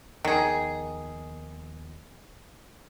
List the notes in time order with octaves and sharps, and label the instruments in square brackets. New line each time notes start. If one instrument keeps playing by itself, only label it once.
[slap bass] D#2 F3 B3 [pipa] D#3 G#4